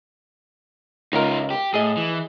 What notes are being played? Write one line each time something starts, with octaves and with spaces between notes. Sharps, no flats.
C#2 D#4 F4 A#4
G4
A2 G#4 D#5
E3